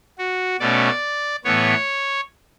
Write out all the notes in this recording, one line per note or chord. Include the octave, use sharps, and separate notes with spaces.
F#4
B2 A3 C#4 D5
A2 E3 B3 C#5